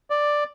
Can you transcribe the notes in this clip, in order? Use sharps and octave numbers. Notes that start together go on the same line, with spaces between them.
D5